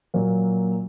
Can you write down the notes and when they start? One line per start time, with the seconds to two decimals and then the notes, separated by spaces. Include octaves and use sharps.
0.14 A#2 F#3 A#3